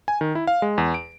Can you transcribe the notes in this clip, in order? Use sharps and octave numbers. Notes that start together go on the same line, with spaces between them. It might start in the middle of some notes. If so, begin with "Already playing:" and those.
G#5
D#3
E4
F5
G#3
E2
D7